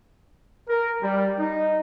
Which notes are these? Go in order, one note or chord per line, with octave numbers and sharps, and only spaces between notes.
A#4
G3
D#4